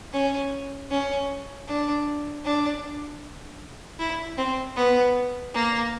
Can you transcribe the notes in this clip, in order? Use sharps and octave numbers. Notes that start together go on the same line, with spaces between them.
C#4
C#4
D4
D4
E4
C4
B3
A#3